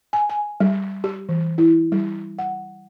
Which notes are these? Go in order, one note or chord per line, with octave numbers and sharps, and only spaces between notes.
G#5
G#5
G3
G4
E3
E4
G3
F#5